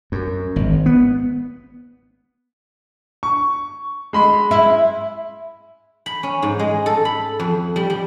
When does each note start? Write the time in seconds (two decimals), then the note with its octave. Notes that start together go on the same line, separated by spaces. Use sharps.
0.12 F#2
0.56 G#1
0.86 B3
3.23 C#6
4.13 G#3 B5 C6
4.51 E4
6.06 B5
6.23 C#4
6.42 G#2
6.59 G#3
6.86 A4
7.05 B5
7.40 F2
7.76 G3
7.90 G3